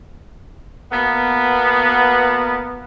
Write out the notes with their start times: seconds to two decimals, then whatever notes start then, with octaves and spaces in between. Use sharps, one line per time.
0.92 B2 A#3 B3